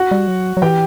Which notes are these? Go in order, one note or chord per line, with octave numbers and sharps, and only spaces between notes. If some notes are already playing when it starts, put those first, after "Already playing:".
Already playing: F#4 F#5
G3
F#3
F#3
E3 G4 G5